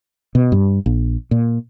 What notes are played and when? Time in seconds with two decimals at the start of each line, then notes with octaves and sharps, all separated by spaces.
0.35 B2
0.52 G2
0.86 A#1
1.31 A#2